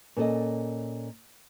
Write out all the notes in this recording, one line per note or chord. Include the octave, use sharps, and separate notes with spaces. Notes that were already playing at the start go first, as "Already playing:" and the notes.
A#2 C#4 A4 D#5